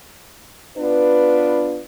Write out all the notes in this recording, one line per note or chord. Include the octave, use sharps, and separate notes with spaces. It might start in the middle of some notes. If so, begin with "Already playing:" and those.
B3 D4 F4 B4